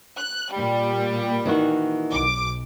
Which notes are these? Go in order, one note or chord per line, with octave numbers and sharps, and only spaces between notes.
F#6
A#2 G3
D#3 E3 F#4
B1 D6